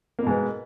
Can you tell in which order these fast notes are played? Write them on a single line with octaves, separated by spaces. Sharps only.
A#3 B2 G#2 B3